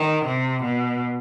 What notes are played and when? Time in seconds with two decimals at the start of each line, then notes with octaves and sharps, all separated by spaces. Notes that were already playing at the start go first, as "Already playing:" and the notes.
Already playing: D#3
0.26 C3
0.63 B2